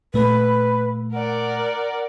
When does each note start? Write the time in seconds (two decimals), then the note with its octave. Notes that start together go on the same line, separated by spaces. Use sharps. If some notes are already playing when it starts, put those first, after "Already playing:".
0.14 A#2 A3 B4
1.13 A#4 D5 F#5